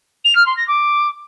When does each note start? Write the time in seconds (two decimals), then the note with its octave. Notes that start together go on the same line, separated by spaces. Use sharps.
0.25 F7
0.35 F6
0.46 C6
0.57 A#6
0.68 D6